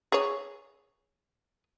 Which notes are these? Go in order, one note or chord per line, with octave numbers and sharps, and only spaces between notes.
G#4 C#5